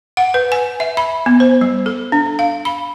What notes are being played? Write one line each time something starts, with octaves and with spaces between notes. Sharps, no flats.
F#5
B4
G#5
E5
B5
B3
C5
G3
A4
D4
F5
B5